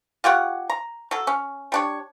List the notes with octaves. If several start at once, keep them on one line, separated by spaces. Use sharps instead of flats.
F4 G4 C#5 F#5
A#5
F#3 A4
C#4
G3 D4 C#5